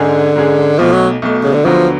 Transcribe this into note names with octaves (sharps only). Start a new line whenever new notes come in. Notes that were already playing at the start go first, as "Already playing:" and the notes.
Already playing: G#2 D3 G#3 C#4 G#4
G#2 G#3 C#4 G#4
B1 B2 F3 A3
F#3
B1 B2 A3
C#3
D3
D2 D3 F3 F#3 B3